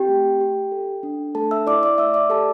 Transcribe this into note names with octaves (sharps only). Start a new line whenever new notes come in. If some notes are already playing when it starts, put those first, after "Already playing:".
Already playing: C4 G4 G5
A3
G4
A4
D4
A3 A4 A5
E5 E6
E4 D5 D6
D5 D6
A3 E5 E6
D5 D6
G4 A4 A5